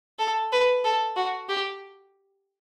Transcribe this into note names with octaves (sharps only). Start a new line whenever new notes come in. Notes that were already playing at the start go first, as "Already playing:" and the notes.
A4
B4
A4
F#4
G4